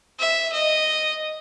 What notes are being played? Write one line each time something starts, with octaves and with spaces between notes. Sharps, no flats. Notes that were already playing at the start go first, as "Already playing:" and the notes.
E5
D#5